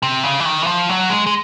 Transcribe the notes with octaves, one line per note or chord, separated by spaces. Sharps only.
C3
C#3
E3
D#3
E3
F3
F#3
G#3
G#3